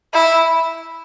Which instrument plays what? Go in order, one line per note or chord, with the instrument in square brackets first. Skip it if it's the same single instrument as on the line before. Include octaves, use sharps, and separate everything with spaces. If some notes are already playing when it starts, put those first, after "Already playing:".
[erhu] E4